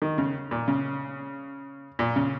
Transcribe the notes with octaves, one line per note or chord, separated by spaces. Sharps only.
D#3
C#3
A#2
C#3
A#2
C#3